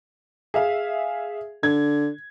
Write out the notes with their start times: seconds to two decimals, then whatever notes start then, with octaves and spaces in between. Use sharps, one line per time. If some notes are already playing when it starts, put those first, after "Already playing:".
0.54 G#4 E5 F5
1.63 D3 G#6